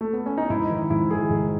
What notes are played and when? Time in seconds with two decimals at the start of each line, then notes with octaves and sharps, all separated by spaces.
0.01 A3
0.13 B3
0.26 C#4
0.38 D#4
0.50 G#2 E4
0.70 D#3
0.90 G#2 E4
1.10 D#3 G#4
1.31 G#2